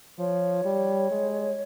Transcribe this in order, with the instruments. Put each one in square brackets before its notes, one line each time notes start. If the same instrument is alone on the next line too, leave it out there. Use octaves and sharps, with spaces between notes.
[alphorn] F3 [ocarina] C#5
[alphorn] G3
G#3